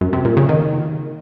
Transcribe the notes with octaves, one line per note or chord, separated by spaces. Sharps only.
F#2
C3
A#2
C#3
D#3